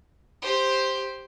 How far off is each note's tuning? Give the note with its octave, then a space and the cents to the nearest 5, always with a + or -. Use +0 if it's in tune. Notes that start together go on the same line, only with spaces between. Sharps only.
G4 +0 C5 +0